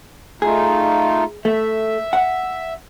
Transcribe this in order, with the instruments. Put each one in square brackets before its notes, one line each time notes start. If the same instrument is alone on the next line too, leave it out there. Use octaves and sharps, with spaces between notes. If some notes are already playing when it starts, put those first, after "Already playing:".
[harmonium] A3 D#4 F4 [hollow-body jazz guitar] G#4
[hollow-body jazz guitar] A3 [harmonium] E5
[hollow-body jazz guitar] F#5